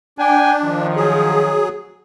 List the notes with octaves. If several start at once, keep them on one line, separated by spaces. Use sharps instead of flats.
D4 G5 G#5
D#3 F3
F#3 G#4